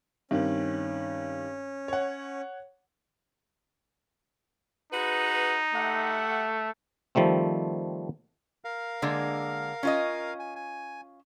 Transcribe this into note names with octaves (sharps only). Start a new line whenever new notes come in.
G2 D#3 C4 C#4
C#5 F#5
D#4 F#4 G#4 B4
A3 G4 E5 F#5
D#3 F3 G3 A3 C4
A#4 F5
D3 G#3 A#3
C#4 F4 D#5
G#5
G#5